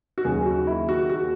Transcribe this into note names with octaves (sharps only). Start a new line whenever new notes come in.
F#4
D#2 C#3 F#3 G#4
F#4
E4
F#4
F#4